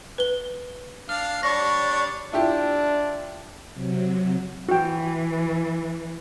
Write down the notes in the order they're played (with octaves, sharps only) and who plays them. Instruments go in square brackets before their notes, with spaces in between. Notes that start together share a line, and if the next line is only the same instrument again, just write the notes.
[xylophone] B4 G7
[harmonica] D4 F5 [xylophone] F6
[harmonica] G3 D4 C#5 [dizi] D5 [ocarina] C#6 [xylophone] A#6
[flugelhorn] D4 [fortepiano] E4 F4 G4
[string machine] C3 F#3
[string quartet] E3 [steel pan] F#4 G5